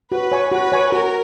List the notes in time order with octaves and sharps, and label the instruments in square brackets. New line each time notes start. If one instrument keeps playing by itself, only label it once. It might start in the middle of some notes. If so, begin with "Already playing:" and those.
[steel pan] F#4 [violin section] B4
[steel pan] C#5 G#5 C#6
[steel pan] F#4 [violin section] B4
[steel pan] C#5 G#5 C#6
[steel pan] F#4 [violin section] A#4